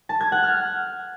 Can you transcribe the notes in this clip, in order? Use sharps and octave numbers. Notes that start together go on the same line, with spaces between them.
A5
G#6
F#5
F6